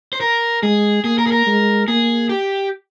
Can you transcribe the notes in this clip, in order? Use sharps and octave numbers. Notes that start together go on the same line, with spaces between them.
C5
A#4
G#3 G#4
A#3 G#4
A#4
G#4
A#4
G#3
A#3 G#4
G4